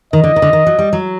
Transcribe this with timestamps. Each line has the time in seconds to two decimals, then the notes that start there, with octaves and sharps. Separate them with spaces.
0.13 D#3 D#5
0.24 D3
0.36 D#3
0.42 D3
0.53 D#3
0.67 F#3
0.79 G3
0.93 F#3